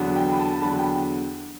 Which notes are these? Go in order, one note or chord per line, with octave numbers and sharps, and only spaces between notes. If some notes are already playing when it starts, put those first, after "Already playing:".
Already playing: E2 D3 F#3 B3 D4
G5
B5
A5
A5
E2 D3 F#3 B3 D4 B5
G5